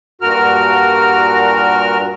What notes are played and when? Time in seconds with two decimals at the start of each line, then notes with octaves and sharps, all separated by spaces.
0.21 G2 A#2 F#4 A#4 F6